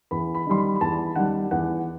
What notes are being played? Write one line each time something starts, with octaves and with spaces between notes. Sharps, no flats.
E2 B5
B5
D#3 G3 C6
B5
B5
E2 A5
D#3 G3 F#5
E2 F#5